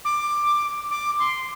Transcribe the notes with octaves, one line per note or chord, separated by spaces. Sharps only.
D6
D6
C6